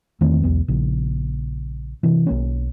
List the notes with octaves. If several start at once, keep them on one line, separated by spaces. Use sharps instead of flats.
E2 D#3 A3 C4
B1 E2 B3
A#1 C#3
C3 E3
B1 A#3 C#4